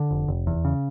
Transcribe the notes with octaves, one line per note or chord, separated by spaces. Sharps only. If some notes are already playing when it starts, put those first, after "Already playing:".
Already playing: D3
F1
F1
E2
C#3